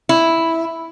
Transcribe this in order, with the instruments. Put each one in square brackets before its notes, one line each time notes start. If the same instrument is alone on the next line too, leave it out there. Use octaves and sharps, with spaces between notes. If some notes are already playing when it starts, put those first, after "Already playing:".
[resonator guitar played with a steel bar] E4